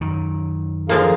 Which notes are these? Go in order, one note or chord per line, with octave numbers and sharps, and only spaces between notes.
F#2 D#3
D3 F3 A#3 G#4 A#4 F5